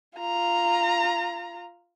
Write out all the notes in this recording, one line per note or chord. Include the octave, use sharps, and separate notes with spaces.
F4 A#5